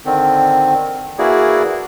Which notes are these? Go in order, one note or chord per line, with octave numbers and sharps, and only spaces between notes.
D3 D#3 C4
E3 A#3 E4 F#4 G#4 D5